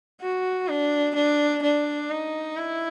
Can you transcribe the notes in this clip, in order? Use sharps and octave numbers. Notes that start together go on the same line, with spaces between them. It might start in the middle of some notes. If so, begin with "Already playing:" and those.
F#4
D4
D4
D4
D#4
E4